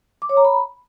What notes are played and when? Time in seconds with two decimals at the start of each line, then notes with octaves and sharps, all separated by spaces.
0.22 D6
0.29 C#5
0.37 A#5
0.45 B5